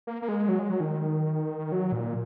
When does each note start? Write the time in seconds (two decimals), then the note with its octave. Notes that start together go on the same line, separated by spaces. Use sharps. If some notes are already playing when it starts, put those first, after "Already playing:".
0.07 A#3
0.22 A#3
0.28 G#3
0.49 F#3
0.59 G#3
0.69 F#3
0.80 D#3
1.72 F#3
1.92 A#2